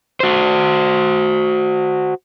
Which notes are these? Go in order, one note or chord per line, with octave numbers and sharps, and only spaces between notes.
F#4 C5